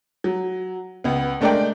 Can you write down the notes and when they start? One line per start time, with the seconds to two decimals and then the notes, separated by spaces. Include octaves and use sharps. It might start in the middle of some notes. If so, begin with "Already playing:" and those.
0.24 F#3
1.04 C#2 B3
1.41 G#3 A3 D4 A#4 D5 G5